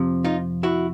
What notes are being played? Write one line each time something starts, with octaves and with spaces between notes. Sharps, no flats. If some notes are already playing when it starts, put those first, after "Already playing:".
Already playing: F2 C3 F3
D#4 F4
E4 F#4